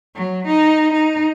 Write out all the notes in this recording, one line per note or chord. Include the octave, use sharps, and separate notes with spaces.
F#3
D#4
D#4